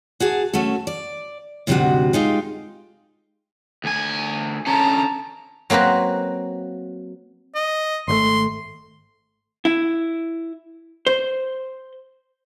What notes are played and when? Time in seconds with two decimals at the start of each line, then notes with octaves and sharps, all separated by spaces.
0.20 F#4 G#4 A5
0.53 A3 C#4 F#4 A4
0.87 D5
1.67 D2 G#2 C3 F#3 D4 F#4
2.13 G#3 D#4 F4 G4
3.84 D2 G#5
4.67 D3 C#4 A5 A#5
5.70 F#3 A#3 C4 B4 C5
7.55 D#5
8.08 G#1 C#3 A3 C6
9.65 E4
11.07 C5